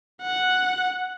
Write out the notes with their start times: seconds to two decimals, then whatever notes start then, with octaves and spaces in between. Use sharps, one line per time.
0.21 F#5